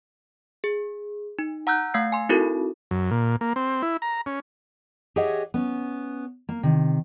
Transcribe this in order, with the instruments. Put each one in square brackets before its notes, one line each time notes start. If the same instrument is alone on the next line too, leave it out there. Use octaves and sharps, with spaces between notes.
[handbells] G#4
D#4
F#5 A#5 E6 F#6 G6
A3 F5 E6 G#6 C7
G#5 C6
C4 D#4 E4 F#4 A4 A#4
[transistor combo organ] F#2
A#2
A#3
C4
E4
A#5
C#4
[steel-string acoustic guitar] G4 G#4 C#5 D#5 E5 F#5
B3 C#4
A#3
C3 D#3